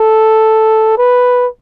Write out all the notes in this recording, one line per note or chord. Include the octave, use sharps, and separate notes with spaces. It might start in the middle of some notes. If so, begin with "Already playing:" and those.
Already playing: A4
B4